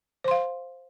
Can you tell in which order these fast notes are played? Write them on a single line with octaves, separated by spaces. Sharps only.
C5 C6 F5